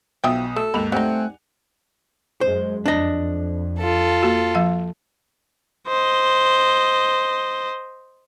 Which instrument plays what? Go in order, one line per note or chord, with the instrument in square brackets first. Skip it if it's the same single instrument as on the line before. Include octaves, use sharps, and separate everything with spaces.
[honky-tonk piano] B1 B2 D#6 [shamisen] F3 E5 G5
[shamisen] A3 [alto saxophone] A4
[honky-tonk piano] D#2 G#2 F7 [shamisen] B5
[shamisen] G3 D#4 [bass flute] A3 [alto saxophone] C4 [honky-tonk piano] F#5 G#5
[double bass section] F#2 G#3 [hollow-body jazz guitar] C5
[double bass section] F2 [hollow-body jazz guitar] D4 D#5
[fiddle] F4 A4
[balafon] A#3 F#4
F3 F5
[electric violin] C5 D#5